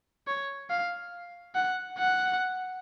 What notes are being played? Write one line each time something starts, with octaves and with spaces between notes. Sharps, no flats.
C#5
F5
F#5
F#5